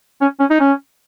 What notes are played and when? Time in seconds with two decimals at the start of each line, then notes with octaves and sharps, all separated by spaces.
0.21 C#4
0.40 C#4
0.50 D#4
0.60 C#4